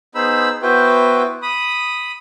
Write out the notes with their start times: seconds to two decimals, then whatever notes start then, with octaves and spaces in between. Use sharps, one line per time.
0.15 B3 D#4 G#4 C5 B5 E6
0.62 B3 E4 F#4 B4 C5 G5
1.42 B5 D#6